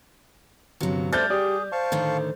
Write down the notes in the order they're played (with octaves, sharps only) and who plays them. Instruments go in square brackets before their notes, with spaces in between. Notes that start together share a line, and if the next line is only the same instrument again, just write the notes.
[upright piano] G1 [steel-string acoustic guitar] C3 F#3
[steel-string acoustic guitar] G3 [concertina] A3 D5 [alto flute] C5 [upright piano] F6 G6 A6
[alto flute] G4 [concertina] G#4 [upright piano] D5
[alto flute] C5 [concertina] F5 A5 C#6
[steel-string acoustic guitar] A2 D3 D#3